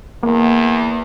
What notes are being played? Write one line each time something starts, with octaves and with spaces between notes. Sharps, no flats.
E2 A#3